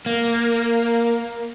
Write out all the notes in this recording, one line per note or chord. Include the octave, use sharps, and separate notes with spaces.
A#3